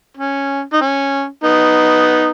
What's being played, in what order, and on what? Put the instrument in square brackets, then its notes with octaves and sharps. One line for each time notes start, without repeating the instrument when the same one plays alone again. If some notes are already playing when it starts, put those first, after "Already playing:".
[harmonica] C#4
D#4
C#4
B3 D#4